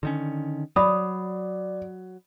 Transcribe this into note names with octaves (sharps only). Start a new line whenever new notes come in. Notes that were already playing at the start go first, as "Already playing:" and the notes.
D3 D#3 C#4
F#3 D5 B5 D#6